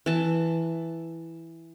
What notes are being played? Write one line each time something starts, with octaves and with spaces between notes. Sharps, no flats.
E3 A5